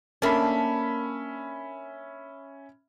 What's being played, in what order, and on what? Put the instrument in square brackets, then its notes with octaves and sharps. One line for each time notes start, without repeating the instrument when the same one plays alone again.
[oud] A#3 D4 [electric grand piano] C#4 E5 B5